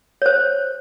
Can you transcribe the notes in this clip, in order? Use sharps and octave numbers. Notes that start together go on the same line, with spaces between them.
C#5
C5